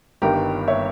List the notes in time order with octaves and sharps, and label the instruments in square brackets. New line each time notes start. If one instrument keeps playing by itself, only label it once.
[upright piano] G1 G2 D#3 G4 A#4
C#5 E5